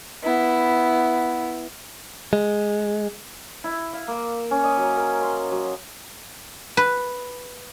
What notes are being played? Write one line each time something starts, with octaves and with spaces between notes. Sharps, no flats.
B3 E4
G#3
E4
F5
A#3
C#4
D#5
F#3
A#4
C6
F#3
B4